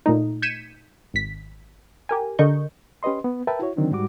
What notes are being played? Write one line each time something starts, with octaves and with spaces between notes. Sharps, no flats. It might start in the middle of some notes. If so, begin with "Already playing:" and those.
A#2 A3 D#4
G6 G#6 B6 C#7 D#7 E7
G#1 B6
G4 A#4 G#5
D3 A#4 D#5 C#6 G6
C#4 G4 B4 D#5 C6
B3
A#4 B4 E5 G5 A5
E4 F#4 C#5
D3 D#3 F#3 C4 D4 D#4
G#2 G3 F#4 D6